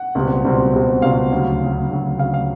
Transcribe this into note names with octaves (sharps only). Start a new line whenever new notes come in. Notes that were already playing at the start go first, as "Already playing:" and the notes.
Already playing: F#5
C#2 B2 G3 C4
C#2 B2 G3 C4
C#2 B2 G3 C4
C#2 B2 G3 C4 F5
D2 C#3 F#3
D2 C#3 F#3
D2 C#3 F#3
D2 C#3 F#3 F5
F5